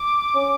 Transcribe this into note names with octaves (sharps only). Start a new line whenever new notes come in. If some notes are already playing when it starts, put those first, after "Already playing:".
Already playing: D6
C#4